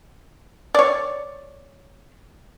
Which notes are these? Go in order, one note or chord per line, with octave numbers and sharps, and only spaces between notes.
C#5 D5